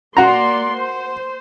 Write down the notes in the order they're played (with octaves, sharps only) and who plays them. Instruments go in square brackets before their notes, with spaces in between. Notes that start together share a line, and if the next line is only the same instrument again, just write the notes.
[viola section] A#3 D5 C6 [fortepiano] F#4 A#5
[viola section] C5